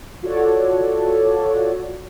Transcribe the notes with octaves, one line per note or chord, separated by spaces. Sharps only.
F4 F#4 A4 C#5 D5